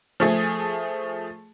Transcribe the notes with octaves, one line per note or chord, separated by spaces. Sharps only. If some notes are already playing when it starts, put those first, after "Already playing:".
F3 A3 G#4